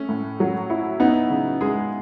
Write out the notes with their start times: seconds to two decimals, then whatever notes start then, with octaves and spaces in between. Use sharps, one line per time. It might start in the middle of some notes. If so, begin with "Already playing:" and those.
Already playing: A3 C#4
0.09 A2
0.40 F#3
0.70 E4
1.00 B3 D#4
1.30 C#3
1.61 G#3 G#4